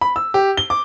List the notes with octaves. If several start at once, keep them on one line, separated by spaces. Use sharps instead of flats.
B5
E6
G4
G7
D6